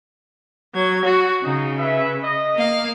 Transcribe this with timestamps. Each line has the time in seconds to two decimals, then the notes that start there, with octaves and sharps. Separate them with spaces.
0.75 F#3 G#6
1.06 F#4
1.44 C#3 D#4
1.78 B4 E5
2.24 D#5
2.55 A#3 F5